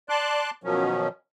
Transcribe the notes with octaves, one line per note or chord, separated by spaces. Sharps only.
D5 A5 C6 D6 F#6
B2 D#3 F3 F#3 C#4